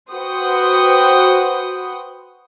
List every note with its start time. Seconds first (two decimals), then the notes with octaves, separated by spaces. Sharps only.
0.12 F#4 B4 C5 F#5 G5 D#6